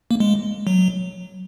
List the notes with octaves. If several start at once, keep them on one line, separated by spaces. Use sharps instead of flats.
A#3
G#3
F#3